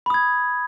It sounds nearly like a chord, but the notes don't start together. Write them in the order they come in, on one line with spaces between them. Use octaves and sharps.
B5 D#6 G#6